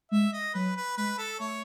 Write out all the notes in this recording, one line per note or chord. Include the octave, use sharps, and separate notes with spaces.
G#3 E5
D#5
F#3 B4
B4
G#3 B4
A4
A3 C#5